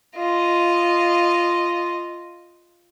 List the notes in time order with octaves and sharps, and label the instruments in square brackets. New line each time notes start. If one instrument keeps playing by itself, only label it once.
[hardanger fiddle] F4 D#5